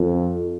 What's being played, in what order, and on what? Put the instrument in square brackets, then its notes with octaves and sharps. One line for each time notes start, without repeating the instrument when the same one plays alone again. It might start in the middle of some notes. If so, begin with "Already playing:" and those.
Already playing: [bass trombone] F2